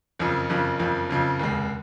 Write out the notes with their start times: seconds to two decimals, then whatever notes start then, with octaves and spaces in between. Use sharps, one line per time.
0.19 F#1 F2 C#3 F3
0.50 F#1 F2 C#3 F3
0.79 F#1 F2 C#3 F3
1.09 F#1 F2 C#3 F3
1.40 F1 D#2 C#3 G#3